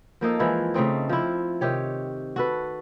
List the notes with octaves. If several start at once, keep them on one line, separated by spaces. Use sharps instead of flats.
F3 A#3 D#4 A4
E3 F3 G#3 E4
C#3 A3 C4 D#4
F3 C4 E4
C3 D#3 G4 C#5
F#4 A4 B4